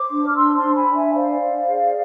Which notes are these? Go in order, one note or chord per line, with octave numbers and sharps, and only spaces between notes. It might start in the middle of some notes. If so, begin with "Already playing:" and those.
Already playing: C5 D6
D4
F6
C5 C6 E6
A5 C6
D4
G#5 B5
D4
E5 G#5
C5 D5 F5
C5
G#4